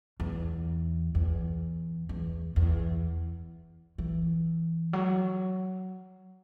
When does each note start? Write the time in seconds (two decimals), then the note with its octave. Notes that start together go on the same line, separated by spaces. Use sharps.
0.20 E2
1.15 E2
2.09 E2
2.56 E2
3.98 E3
4.93 F#3